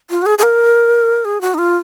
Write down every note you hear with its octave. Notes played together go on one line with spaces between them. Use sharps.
F4
F#4
G#4
G#4
A#4
G#4
F#4
D#4
F4